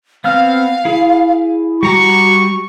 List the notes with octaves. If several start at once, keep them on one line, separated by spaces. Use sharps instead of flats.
B3 C4 F5 F6
E4 G#4
G3 F#4 A#5 C#6 D6